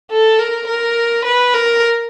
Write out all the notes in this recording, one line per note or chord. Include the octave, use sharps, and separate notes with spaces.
A4
A#4
A#4
B4
A#4